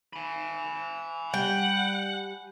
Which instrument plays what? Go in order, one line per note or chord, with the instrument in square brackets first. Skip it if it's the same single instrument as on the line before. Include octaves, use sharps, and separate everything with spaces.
[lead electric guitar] G#5 B5
[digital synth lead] G3 [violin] F#5 [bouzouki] G5